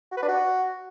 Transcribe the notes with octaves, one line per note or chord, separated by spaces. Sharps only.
F#4
B4
D4
F#4